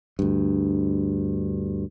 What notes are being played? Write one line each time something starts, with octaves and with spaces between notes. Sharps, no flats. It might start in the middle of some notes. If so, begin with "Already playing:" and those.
D2 G2